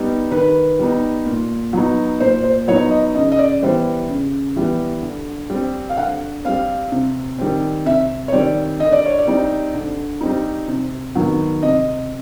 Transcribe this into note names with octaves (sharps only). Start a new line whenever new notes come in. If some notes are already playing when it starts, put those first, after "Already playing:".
Already playing: G3 B3 D#4
D#3 B4
G3 B3 D#4
A#2
F#3 B3 D#4
A#2 C5
C5
F#3 B3 D#4 C#5
D#5
C#3 D#5
D#5
D5
E3 G3 B3 C5
C#3
E3 G3 B3
D3
G3 C4
F5
D3 F#5
G3 C4 F5
C3
D#3 G3 C4
C3 E5
C#5
D#3 G3 C4 D5
D3 D#5
D5
C#5
D5
G3 C4 D#4
D3
G3 C4 D#4
C3
D#3 F#3 B3
C3 D#5